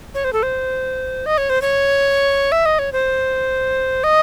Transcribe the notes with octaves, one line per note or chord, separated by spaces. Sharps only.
C#5
C5
A4
C5
D#5
C#5
C5
C#5
E5
D#5
C#5
C5
D#5